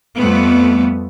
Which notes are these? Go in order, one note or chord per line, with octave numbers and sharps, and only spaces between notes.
F2 G3 A3 B3